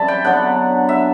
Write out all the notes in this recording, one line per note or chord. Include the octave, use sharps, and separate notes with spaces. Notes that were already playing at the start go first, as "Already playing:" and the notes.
Already playing: F#2 E3 G3 C4 D5 A5 B5
G5
D3 F#3 B3 D4 F#5
E5